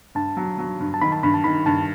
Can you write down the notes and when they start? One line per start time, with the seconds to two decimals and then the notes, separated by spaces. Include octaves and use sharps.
0.15 G2 A5
0.37 F#3
0.59 F#3
0.80 G2
0.94 A5
1.01 D#3 B5
1.12 A5
1.23 G2 B5
1.34 A5
1.44 D#3 B5
1.66 G2 A5